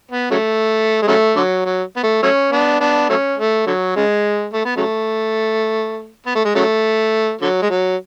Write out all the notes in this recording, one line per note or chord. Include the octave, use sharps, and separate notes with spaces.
B3
C#3 F#3 A3
G#3
C#3 F#3 A3
D3 F#3
F#3
B3
A3
F#3 A3 C#4
B3 D4
B3 D4
F#3 A3 C#4
A3
D3 F#3
C#3 G#3
A3
B3
C#3 F#3 A3
B3
A3
G#3
C#3 F#3 A3
D3 F#3
G#3
F#3